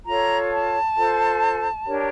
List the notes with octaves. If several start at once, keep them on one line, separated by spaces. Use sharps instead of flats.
F4 A4 C#5 A#5
A5
F4 A4 C5
D4 G4 A#4 C#5